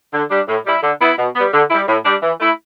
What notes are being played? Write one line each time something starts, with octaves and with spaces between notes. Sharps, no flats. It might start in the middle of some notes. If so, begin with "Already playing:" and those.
D3
G3 D4
A2
G3 E4
D3
B3 E4
B2
G3 B3
D3
G3 E4
A2
G3 D4
E3
A3 E4